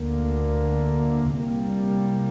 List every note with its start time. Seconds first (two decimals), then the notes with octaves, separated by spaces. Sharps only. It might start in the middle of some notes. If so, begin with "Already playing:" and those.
Already playing: D2 D3 A#3
1.35 C2 C3 G3 A#3